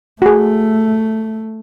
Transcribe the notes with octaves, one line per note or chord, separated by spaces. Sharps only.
A3 F#4 G#4